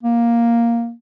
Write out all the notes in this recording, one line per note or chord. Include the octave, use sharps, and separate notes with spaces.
A#3